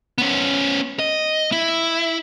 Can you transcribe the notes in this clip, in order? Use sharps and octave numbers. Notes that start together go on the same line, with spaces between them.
B3 C#4
D#5
E4